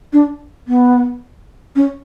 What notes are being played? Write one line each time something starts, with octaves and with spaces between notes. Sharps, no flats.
D4
B3
C#4